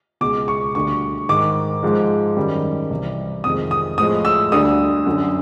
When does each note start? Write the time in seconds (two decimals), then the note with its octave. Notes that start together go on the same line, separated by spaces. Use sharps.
0.21 C#2 B2 G#3 D6
0.48 C#6
0.75 D2 D3 G3 C#6
1.29 G#2 D#3 G#3 D6
1.83 G#2 F3 G#3
2.37 F#2 D#3 G3
2.91 C2 C3 E3
3.44 F2 C3 D#3 G#3 D#6
3.71 D#6
3.98 A2 F3 G#3 D#6
4.25 E6
4.52 D2 D3 G3 D#6
5.06 F#2 D3 F#3